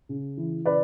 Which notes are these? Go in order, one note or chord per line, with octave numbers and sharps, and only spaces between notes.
C#3
E3
C#3 B4 D5